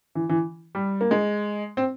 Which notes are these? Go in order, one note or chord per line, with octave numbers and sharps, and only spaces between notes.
E3
E3
G3
A#3
G#3
C4